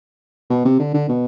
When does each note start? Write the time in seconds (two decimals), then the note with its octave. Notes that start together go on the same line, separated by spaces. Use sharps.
0.50 B2
0.65 C3
0.79 D3
0.94 D3
1.09 B2